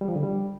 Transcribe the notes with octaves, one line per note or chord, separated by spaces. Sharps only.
G3
F3
D3
G3